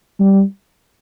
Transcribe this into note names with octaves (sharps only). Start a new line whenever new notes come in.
G3